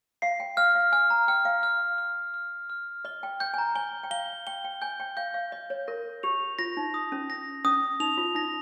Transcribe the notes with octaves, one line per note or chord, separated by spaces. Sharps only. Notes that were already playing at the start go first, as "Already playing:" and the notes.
F5 C7
G5
F5 F6
F5
G#5 F6
A#5
G5 F6
F5
F6
F6
F6
F6
D#5 G7
G5
G5 G6
G#5
A#5
G#5 G7
G5
F5 G7
G5 G7
G5
G#5 G6
G5
F5 G6
F5
D#5 G6
C#5
A#4 A#6
G4 F7
F4 A#6
D#4
D#6
C#4
A#6
C#4 D#6
D#4 F7
F4
D#4 A#6